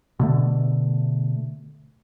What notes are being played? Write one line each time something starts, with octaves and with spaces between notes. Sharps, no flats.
B2 D3 A3